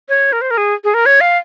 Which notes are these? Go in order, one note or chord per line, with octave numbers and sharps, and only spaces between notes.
C#5
A#4
C5
A#4
G#4
G#4
A#4
C#5
F5